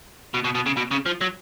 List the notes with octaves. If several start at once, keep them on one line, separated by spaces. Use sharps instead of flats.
B2
B2
B2
C#3
B2
C#3
F3
F#3